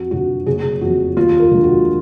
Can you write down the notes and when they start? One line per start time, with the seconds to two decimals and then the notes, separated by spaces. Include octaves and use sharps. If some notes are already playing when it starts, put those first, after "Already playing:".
Already playing: F2 F#4
0.11 D3 F#3 F#4
0.46 F#1 G#4
0.81 F2 F3 F#4
1.17 D#2 F4
1.40 A#4
1.51 D3 F3 G#3
1.64 F#4